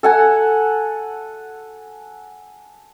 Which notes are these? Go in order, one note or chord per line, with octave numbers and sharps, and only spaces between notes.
A4 F#5 G#5